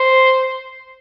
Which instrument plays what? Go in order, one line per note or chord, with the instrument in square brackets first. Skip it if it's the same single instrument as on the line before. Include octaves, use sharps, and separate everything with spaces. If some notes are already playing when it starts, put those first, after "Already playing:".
Already playing: [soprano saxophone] C5